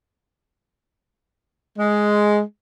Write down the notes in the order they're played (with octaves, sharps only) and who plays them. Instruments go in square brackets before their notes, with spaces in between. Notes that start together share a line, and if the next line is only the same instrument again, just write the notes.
[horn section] G#3